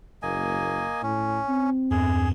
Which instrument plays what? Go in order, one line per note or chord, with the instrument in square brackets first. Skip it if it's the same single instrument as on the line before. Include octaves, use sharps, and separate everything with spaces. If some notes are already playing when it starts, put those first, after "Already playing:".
[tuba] F#1 [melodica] A#3 D#5 G#5
[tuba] A2 [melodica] C#4
[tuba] C4
[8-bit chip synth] E2 G2 [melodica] G#4